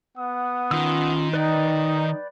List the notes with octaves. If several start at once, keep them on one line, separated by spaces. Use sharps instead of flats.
B3 F#5 D#6
D#3 C#4 F4 E6
D#4 B4 D5 G5